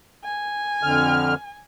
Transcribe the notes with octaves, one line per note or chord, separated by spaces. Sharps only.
G#5
F2 D3 F6